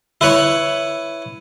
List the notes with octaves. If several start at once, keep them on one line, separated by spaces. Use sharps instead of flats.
E4 B4 C#5